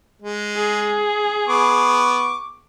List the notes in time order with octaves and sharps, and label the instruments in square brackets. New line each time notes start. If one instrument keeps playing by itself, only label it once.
[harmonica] G#3
[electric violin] G#4
[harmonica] B3 C#6 D6